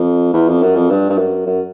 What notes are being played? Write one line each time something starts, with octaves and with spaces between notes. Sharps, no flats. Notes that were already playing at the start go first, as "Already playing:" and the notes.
Already playing: F2
E2
F2
F#2
F2
G2
G2
F#2
F#2